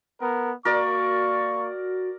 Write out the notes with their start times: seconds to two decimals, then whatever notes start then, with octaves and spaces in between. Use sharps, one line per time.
0.21 B3 A#4
0.65 A#3 F#4 A#4 D5 C#6